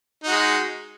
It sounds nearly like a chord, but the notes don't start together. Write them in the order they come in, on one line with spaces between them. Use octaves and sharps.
D#4 F#4 G#3